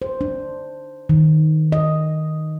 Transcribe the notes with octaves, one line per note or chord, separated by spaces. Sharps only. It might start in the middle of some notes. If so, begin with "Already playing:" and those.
C5
D4
D#3
D#5